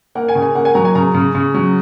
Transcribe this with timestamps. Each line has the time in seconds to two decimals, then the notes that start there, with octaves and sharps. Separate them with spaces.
0.15 A#3 F#5
0.29 G#5
0.35 C#3
0.42 G#5
0.55 A#3 F#5
0.65 G#5
0.75 F#3 A#5
0.85 G#5
0.95 C#3 A#5
1.14 C#3
1.35 C#3
1.54 F#3